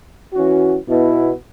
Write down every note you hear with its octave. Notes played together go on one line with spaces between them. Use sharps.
E3 C#4 F#4
B2 B3 E4